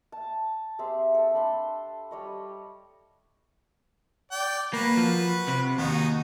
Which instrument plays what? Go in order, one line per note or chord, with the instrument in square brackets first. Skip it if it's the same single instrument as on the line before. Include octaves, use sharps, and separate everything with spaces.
[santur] A5
C4 G4 G#4 E5
A4
D4 B5 C6
G3 C#5 D#5
[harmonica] D5 G5
[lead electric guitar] A#3 [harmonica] F#4 B4
[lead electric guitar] F3
C3
[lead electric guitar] D#2 [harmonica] D#4 F#4